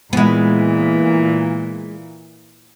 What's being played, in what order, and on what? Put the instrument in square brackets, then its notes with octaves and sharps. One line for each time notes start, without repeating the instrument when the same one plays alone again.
[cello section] A#2 E3 [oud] G#3 B3